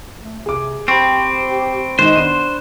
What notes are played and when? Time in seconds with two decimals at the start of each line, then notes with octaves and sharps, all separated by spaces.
0.20 A3
0.46 C3 G#4 D6
0.88 C4 G4 C5 B5 C#6
1.99 D#3 G#3 D#4 C5 F#6 E7
2.16 B3 D4 C6 D#7